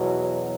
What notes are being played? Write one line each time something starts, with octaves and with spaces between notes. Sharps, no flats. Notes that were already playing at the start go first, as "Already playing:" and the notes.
Already playing: E2 B2 F#3